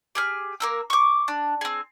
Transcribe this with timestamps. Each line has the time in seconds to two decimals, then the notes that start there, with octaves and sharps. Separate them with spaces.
0.15 G4 G#4 F6
0.60 A#3 A#4 E6
0.90 C#6 D6
1.28 D4
1.61 C4 G#4